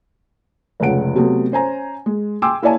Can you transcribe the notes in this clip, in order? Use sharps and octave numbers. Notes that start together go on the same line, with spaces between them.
F1 C#2 C#3 F#5 D7
C3 F#3 A3 B3
C#4 C5 G#5 A#5
G#3
G5 G#5 C6 D6 E6
A#3 E4 C#5 D5 G#5 A5